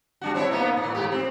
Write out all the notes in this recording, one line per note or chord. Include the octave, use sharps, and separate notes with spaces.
G3 D4 F#4
C4 E4 C#5
A#3 B3 D#4
A2
G#2 G4
C4